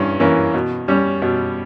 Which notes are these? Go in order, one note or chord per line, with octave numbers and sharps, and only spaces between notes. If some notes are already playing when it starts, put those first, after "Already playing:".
Already playing: G2 E3 C#4
E3 A#3 C#4
B2
G3 C#4
B2